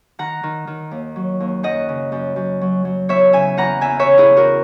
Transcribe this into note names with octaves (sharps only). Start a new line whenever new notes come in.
D#3 F#5 A#5
D#3
D#3
D#2
F#3
D#2
F#2 D#5 F#5
C#3
F#2
F#2
F#3
F#3
E2 C#5 E5
C#3 E5 G#5
E2 F#5 A#5
E2 E5 G#5
C#5 E5
C#3
E4 G#4
E2
F#4 A#4